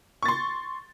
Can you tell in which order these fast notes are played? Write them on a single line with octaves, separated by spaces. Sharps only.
C#6 A6 C6